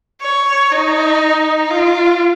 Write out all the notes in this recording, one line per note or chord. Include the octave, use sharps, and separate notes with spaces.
C#5
D#4
F4